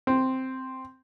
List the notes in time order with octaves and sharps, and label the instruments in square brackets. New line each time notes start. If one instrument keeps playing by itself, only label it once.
[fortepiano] C4